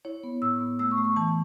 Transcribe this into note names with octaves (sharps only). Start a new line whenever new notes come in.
E4 C#5
B3
A2 E6
B3
A3 E6
C#6
A3
C#6
E3 A5